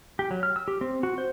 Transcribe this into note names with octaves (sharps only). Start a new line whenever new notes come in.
G4
F#3
F6
E6
G4
C4
F#4
C5